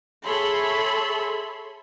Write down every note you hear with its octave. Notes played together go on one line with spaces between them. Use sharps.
G#4 A4 C#5 E5 B5 C6